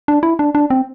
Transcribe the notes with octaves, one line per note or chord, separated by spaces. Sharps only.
D4
E4
D4
D4
C4